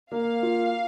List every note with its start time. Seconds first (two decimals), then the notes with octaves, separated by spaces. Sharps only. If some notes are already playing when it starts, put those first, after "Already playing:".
0.11 A#3 F5
0.43 F4